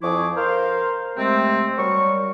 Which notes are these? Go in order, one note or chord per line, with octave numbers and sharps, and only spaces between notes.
F2 F3 E4 G#4 C#6 D6
A#4 C5 F5
C3 G#3 A3 C4
F#3 G3 A#4 C#6